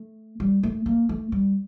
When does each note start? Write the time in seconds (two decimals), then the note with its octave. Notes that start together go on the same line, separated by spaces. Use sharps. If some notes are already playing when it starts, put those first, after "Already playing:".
Already playing: A3
0.40 G3
0.63 A3
0.86 A#3
1.09 A3
1.32 G3